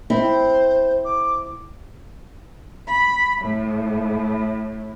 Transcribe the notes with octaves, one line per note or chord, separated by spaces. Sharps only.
C4 E4 C5
D6
B5
A2